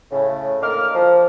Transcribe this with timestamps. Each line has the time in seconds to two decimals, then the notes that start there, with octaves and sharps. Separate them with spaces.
0.11 A2 C#3
0.62 D3 A#3 A#4 D#5 D6 F6
0.94 F3